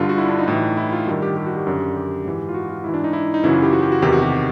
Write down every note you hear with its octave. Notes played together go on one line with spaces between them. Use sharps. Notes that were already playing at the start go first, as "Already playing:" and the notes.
Already playing: G2 D3 F4
F#4
E4
D4
D#4
A2 E3
E4
F4
G2 D#3 F#4
G4
G4
F#4
G4
F#2 D3
G4
G#2 E3
F4
F#4
F4
G#2 E3 E4
D4
D#4
E4
D#4
F#2 C#3 E3 E4 F#4
F4
G4
F#4
G4
F#4
E2 C3 D#3 G4
F#4
G4